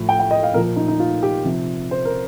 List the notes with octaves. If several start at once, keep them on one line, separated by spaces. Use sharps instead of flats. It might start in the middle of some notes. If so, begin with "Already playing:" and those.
Already playing: A2 F3
G5
G5
D#5
F5
A#2 F3 A#4
D#4
D#4
F4
G4
C3 F3
C5
A#4